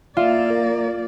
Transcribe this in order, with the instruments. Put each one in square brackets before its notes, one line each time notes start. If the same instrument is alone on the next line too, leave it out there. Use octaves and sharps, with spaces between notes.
[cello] A#3 D5 [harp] F4 [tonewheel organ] E5 F5
[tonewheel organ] A#4